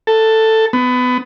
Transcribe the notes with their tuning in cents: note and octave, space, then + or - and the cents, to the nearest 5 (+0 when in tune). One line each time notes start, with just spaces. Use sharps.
A4 +10
B3 +25